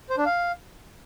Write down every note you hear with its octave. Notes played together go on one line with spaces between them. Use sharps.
C5
D4
F5